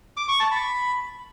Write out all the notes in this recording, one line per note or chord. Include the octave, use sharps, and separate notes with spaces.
D6
C#6
A5
B5